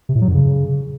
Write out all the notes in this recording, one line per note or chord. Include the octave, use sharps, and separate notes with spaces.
C3
A2
F#3
F#2
C#3